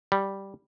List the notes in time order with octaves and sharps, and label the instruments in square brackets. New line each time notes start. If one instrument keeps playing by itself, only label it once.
[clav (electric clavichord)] G3